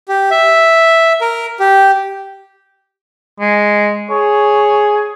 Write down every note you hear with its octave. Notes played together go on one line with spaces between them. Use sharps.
G4
E5
A#4
G4
G#3
G#4 C#5